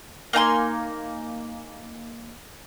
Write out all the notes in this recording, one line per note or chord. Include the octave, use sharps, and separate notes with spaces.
A#3 D#4 G#5 C6